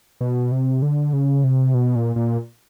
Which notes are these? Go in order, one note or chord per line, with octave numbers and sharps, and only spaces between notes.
B2
C3
D3
C#3
C3
B2
A#2
A#2